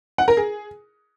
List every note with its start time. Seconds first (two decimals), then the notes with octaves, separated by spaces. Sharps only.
0.18 F#5
0.28 A#4
0.37 G#4